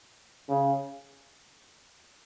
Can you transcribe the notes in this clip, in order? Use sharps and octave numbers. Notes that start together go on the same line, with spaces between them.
C#3